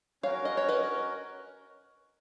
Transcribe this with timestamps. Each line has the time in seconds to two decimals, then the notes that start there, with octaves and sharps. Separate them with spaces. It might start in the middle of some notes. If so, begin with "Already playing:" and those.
0.23 C#4 F#4 A#4 C#5 F5
0.45 D#5
0.57 C#5
0.69 B4 D#5